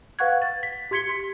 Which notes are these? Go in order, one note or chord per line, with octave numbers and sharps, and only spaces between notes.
B4 F5 F#5 C#6 F#6 G#6
A6
B6
G4 C6 G#6 B6 C#7 G7
C6 B6